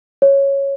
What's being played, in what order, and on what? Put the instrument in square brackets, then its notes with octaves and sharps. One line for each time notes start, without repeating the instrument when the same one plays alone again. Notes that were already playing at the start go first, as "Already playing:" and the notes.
[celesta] C#5